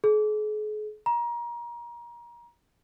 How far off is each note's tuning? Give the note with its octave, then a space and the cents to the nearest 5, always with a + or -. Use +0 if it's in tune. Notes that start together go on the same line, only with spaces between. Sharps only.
G#4 +40
A#5 +30